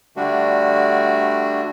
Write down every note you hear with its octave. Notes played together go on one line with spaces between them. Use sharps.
D3 G3 A3 D4 F#4